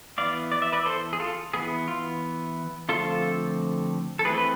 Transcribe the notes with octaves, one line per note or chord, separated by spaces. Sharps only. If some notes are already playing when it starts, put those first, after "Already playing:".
E3 B3 D5 F5
D5
E5
B4 D5
A4 C5
G#4
F4 A4
E3 B3 G#4
F4
D3 F3 A3 C4 F4 A4
A4
E3 A3 C4 G#4 B4
B4